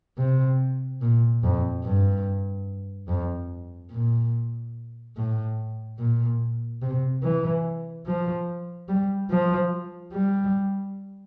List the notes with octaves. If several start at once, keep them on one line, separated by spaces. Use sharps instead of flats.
C3
A#2
F2
G2
F2
A#2
A2
A#2
C3
E3
F3
G3
F3
G3